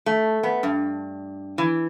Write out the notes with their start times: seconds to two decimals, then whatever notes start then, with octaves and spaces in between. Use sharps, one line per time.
0.06 A3
0.43 B3
0.63 G2
1.58 E3